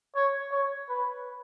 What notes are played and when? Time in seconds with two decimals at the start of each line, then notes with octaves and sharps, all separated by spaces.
0.16 C#5
0.52 C#5
0.89 B4